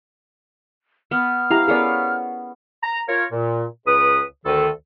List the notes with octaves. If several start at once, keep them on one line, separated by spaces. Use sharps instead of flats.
B3 F6
E4 G4 F5 A#5
B3 C#4 G#4 A#4 D5 F5
A#5
F4 A#4 C#5
A#2
C#2 B4 D#6
D2 D#3 A4